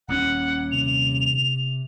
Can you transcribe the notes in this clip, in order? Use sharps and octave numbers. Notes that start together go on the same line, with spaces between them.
D#1 D#2 C#4 F#5
C3 F7